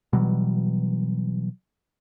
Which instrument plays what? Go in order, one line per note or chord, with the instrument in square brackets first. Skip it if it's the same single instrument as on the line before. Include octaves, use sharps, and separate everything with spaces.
[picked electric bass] B2 E3 F#3 G3